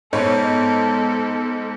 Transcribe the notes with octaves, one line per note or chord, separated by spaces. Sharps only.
G#2 B3 A4 C5 C#5 E6